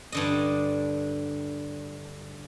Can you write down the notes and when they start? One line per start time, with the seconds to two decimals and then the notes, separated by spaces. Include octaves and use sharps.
0.12 G2 D3 D#5